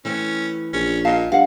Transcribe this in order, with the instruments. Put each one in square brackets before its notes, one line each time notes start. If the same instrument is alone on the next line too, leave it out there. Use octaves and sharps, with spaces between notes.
[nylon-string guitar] E3 A3 C4 [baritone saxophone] C#4
[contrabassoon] A#1 [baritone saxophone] C#4
[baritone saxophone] A#2 [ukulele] D#5 F5 [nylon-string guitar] A5
[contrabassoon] G2 [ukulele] F5 F#5